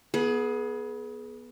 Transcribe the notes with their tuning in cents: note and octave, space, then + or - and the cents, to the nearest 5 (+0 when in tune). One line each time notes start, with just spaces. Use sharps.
B3 -20 G#4 +25